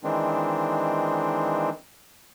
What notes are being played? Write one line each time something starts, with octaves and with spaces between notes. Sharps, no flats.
D#3 E3 G#3 C4 D4